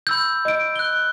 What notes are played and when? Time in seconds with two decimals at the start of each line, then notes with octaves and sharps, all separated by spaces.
0.07 B5 E6 G6
0.45 D#5 D7
0.76 F#6 G7